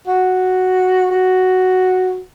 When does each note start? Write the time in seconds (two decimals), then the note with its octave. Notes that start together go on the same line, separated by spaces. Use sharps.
0.07 F#4
1.11 F#4